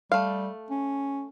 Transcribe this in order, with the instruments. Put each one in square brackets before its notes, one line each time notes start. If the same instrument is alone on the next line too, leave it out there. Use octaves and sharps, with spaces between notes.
[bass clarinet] G3 [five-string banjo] A3 F5
[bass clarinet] C#4